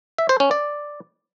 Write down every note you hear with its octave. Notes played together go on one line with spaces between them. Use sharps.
E5
C5
C#4
D5